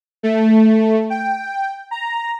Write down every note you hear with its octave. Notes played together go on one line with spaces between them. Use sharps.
A3
G5
A#5